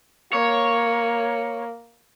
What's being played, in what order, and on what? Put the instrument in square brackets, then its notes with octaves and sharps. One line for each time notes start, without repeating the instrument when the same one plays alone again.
[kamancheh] A#3 [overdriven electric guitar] C#5